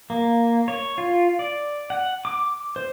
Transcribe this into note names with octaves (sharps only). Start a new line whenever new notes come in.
A#3
C#5
F4
D5
F#5
D6
C5